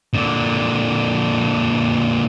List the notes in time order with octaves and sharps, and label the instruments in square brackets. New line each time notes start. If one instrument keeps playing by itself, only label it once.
[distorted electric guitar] A#2 D3